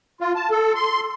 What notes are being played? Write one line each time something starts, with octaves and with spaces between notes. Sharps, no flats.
F4
A5
A4
C6